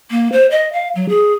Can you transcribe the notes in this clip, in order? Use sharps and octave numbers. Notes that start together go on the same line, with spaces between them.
A#3
C5
D#5
F5
F#3
G#4